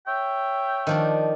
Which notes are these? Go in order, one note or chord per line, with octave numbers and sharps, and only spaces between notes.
C#5 E5 G5
D#3 F3 D4